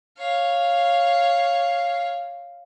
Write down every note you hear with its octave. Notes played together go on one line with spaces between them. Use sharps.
C#5 F5